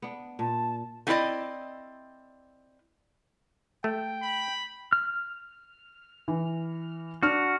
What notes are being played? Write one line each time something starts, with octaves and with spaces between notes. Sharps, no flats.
B3 D4
A#2 A5
A3 C4 E4 F#4 D5 D#5
A3 G5
B5
F6
E3
D4 F#4 F#5 F6